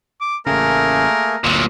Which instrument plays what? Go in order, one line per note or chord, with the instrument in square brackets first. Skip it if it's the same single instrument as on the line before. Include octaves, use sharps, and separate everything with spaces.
[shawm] D6
[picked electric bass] A1 C#3 [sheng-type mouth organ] A3 A#3 G#4 [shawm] A#4
[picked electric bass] G1 D2 [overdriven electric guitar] A#2 F#3